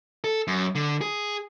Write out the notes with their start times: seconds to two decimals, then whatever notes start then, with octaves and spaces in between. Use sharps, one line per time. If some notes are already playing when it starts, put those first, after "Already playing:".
0.24 A4
0.47 F#2
0.75 D3
1.01 G#4